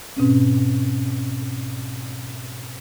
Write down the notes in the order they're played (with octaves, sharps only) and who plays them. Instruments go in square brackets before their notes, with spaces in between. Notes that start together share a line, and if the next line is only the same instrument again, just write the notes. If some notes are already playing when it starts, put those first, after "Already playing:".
[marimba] G#2 B2 C4 C#4